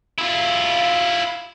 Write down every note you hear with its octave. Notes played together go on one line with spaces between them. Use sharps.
E4 F4